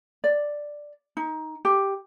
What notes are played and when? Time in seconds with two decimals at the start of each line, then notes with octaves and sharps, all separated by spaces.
0.24 D5
1.17 D#4
1.65 G4